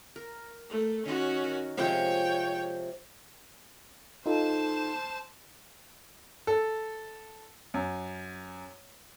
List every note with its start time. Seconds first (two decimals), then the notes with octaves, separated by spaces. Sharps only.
0.16 A#4
0.70 A3
1.06 D#3 C#4 F#4 D#5
1.44 A#4
1.77 C3 F3 G#3 C#5 G5
4.26 D#4 F4 A4 C5 A5
6.47 A4
7.74 F#2